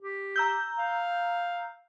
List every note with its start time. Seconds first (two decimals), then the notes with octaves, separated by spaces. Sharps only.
0.01 G4
0.36 A#5 E6 G6
0.79 F5